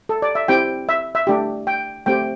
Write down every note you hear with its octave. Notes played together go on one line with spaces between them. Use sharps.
A4
D5
E5
C4 E4 G4 G5
E5
E5
A3 D4 G4
G5
A3 C4 G4 G5